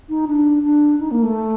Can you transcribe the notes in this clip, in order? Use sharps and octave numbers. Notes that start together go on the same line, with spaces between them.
D#4
D4
D4
D#4
A#3
A3